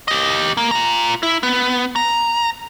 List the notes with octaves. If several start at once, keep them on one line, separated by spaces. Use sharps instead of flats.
G4 D#5
A#3
F4 A#5
E4
B3
A#5